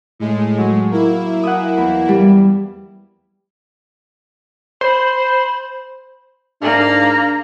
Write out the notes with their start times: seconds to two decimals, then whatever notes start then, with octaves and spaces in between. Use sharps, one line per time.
0.19 A2 G#3
0.58 F#3
0.91 A#3 E4
1.43 F#5 G#5 D#6
1.78 E2
2.09 G3
4.81 C5 B5
6.62 G#2 A#3 D4 A#5